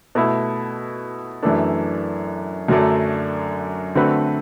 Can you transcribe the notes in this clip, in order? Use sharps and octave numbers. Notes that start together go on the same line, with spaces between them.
B2 A3 E4
F#2 E3 A3 D4
F#2 D3 F#3 A3 D4
D3 A3 C4 F#4 B4